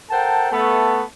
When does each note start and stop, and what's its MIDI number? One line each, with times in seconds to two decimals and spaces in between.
0.10 0.48 69
0.10 0.48 70
0.10 0.48 72
0.10 0.48 78
0.10 0.48 79
0.10 0.48 81
0.51 1.01 57
0.51 1.01 59
0.51 1.01 69